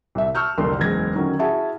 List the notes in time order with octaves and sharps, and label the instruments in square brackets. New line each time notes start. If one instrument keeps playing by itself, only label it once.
[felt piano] C2 E5
A5 C#6 E6 F6 G6
C2 F2 D3 A#3 D4 C6
F#1 E2 G#3 G#6 A#6
D3 D#3 F#3 C#4
E4 F#4 G#4 E5 A5